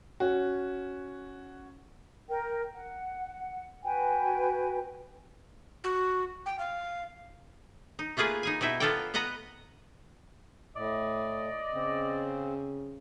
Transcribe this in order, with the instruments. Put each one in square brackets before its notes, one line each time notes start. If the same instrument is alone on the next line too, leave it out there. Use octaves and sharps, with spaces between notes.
[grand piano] C#4 F#4
[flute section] A#4 G5
F#5
F#4 B4 G5 G#5
[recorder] F#4
G5
F5
[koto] D#4
A3 A#3 F4 G#4 B4
D#4 G#4 G#5
B2 D#4 E4 E5 G5
B3 F4 A4 A#4 D5 G5
B3 B4 D#5 F#5 A#5
[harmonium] A2 [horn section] D5 D#5
[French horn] C#3 [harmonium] C4